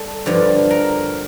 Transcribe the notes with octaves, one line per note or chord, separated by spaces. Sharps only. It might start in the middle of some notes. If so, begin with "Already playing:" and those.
Already playing: G3 A4
G2 D3 F3
A#4